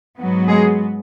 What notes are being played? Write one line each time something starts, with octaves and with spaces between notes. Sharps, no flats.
G#2 F#3 B3
G#3 G#4